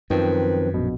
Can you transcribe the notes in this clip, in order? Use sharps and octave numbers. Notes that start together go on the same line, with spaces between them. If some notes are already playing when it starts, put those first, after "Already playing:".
F#2 D#3 F3 C4 B4
A#1 B2